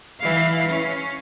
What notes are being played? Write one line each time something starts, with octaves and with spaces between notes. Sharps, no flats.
E3 F5
C#4